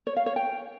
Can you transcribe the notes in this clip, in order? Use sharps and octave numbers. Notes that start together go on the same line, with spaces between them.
C#5
F5
C#5
G5